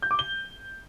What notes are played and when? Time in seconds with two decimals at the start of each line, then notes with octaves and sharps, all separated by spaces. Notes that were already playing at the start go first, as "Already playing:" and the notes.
0.02 G6
0.11 D6
0.19 G7